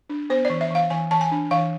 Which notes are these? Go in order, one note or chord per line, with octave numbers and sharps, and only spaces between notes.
D4
B3 C5
D5
E3
E5
E3 F5
E3 G#5
E3 A5
G#5
D4
E3 F5